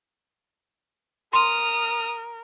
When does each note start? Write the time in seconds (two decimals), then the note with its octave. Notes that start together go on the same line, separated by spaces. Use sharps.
1.33 A#4 C6 D#6 F6